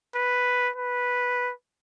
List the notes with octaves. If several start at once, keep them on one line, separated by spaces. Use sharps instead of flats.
B4
B4